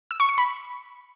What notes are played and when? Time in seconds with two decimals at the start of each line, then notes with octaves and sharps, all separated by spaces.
0.11 E6
0.20 C#6
0.29 C#7
0.38 B5